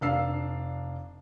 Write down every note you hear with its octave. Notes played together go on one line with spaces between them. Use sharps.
F1 D4 F5 E6 C7